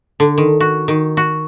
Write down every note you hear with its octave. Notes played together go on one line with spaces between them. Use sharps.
D3
D#3
F#4
D#3
F#4